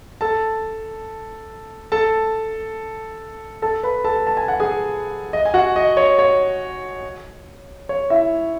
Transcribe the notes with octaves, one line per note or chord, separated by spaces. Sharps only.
A4 A5
A4 A5
A4 A5
B4 B5
A4 A5
A5
G#5
F#5
G#4 G#5
D#5
G#5
F#4 F#5
D#5
C#5
C#5
C#5
E4 E5